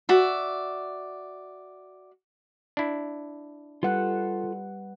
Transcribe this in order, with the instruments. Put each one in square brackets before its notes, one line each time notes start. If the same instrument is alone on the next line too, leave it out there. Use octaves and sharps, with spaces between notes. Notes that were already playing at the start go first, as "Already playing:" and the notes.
[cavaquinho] F#4 D5 E5
[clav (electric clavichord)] D4 E4
[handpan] G3 B4 F#5 [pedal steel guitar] F4 A4 F#6